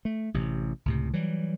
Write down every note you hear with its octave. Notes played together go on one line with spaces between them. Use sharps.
A3
A1 C3
C#2 A2 C3
E3 F#3 G3